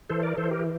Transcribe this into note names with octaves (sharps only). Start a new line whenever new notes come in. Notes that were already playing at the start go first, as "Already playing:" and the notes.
E3 A4 C5
A#4 D5
E3 A4 C5
G4 A#4